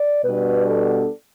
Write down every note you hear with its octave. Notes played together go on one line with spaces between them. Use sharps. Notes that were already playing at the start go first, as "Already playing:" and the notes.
Already playing: D5
B2 G3 B3 D4 B4
A4